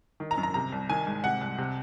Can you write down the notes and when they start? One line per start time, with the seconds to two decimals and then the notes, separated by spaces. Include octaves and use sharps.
0.20 D#3
0.31 A#5
0.38 F#2
0.43 A#5
0.54 C3 A#5
0.72 C2
0.90 D#3 G#5
1.07 G#2
1.24 C3 F#5
1.41 C2
1.58 C3